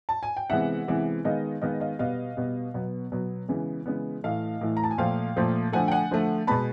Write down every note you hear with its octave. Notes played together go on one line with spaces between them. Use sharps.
A5
G#5
G5
C3 E3 G#3 B3 E5 F#5
C3 E3 G#3 B3
D#3 G#3 B3 D#5 F5
D#3 G#3 B3 D#5 F5
D#5 F5
B2 G3 B3 D#5 F5
B2 G3 B3
B2 F#3 B3
B2 F#3 B3
C#3 E3 G#3 B3
C#3 E3 G#3 B3
A2 E3 A3 D#5 F5
A2 E3 A3
A#5
A5
G#5
A#2 F3 A3 F5 G5
A#2 F3 A3
D3 F3 A3 F#5 G#5
G5
F#5 G#5
D3 F3 A3
B2 G#3 B3 A5 B5